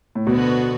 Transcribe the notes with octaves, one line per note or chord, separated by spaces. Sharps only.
A2
D2 B2 D3 B3 F#4